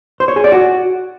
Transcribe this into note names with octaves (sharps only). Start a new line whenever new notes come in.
C5
C#5
G#4
D5
F#4